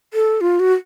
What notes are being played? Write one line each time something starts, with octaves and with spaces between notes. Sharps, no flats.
A4
F4
F#4